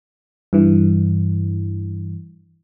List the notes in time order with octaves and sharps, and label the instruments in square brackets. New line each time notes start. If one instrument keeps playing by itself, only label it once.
[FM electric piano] G2 E3